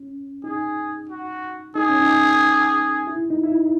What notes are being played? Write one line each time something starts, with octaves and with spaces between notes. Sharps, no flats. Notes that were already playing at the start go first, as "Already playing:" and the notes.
Already playing: C#4
D#4 G#4
F#4
D#4 G#4
C#4
D#4
E4
D#4
E4
D#4